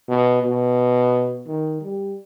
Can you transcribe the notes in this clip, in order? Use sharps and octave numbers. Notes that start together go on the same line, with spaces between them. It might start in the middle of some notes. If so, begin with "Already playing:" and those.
B2
B2
D#3
G3